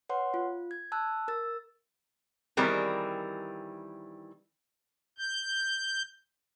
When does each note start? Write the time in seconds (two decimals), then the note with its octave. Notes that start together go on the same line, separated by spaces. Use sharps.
0.09 B4 C#5 F#5 C6
0.34 F4
0.71 G#6
0.92 A5 E6 F#6
1.28 A#4 E6 A6
2.57 D#3 E3 G3 C4 G#4 A#4
5.18 G6